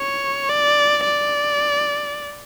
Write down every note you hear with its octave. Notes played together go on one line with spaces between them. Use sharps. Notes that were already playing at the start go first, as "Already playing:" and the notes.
Already playing: C#5
D5
D5